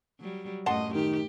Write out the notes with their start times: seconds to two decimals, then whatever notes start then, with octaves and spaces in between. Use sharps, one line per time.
0.20 F#3 G3
0.66 F#2 A2 D#5 F#5 A5 C6
0.95 D#3 G4